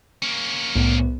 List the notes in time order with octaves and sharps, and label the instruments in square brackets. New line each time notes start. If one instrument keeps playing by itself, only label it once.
[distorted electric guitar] A#3 C#4
[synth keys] C2 B3 [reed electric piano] A2